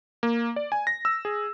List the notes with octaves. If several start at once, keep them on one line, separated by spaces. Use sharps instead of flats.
A#3
D5
G#5
A#6
E6
G#4